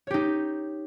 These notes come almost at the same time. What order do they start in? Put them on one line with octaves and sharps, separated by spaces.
C#5 G4 D#4